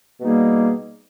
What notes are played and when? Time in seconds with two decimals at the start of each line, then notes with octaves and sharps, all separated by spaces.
0.20 B2 G3 A#3 D#4 G#4